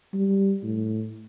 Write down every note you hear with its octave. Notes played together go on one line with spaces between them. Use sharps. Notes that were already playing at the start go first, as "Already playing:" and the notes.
G3
A2